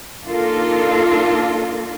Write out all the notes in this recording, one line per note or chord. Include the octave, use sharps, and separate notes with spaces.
A#3 D4 D#4 F4 A4 A#4